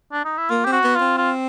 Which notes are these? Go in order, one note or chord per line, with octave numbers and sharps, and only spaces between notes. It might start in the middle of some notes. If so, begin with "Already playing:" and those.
D4
D#4
E4
A#3 F4
C4 G4
F#4
B3
F4
C4
F4